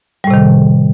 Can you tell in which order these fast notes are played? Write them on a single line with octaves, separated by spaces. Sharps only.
G3 A2 C3 D#3